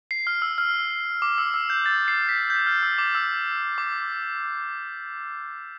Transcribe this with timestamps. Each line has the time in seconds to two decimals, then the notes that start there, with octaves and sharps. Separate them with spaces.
0.11 C7
0.27 F6
0.42 E6
0.58 F6
1.22 D6
1.38 E6
1.54 E6
1.70 G6
1.86 A6
2.08 C7
2.29 B6
2.50 G6
2.67 F6
2.83 E6
2.98 D6
3.15 E6
3.78 D6